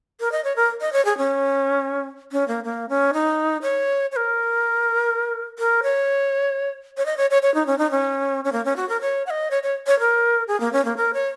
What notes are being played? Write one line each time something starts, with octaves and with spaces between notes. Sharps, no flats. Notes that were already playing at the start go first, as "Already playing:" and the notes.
A#4
D#5
C#5
A#4
D#5
C#5
G#4
C#4
C#4
A#3
A#3
C#4
D#4
C#5
C#5
A#4
A#4
C#5
C#5
D#5
C#5
C#5
C#5
D#4
C#4
D#4
C#4
C#4
A#3
C#4
F#4
A#4
C#5
F#5
D#5
C#5
C#5
C#5
A#4
G#4
A#3
C#4
A#3
A#4
C#5